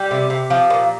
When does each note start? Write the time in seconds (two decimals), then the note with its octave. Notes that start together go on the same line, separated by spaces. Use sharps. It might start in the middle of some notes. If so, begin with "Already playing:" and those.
Already playing: G3 G4
0.11 C3
0.30 C3
0.50 F3
0.70 A#2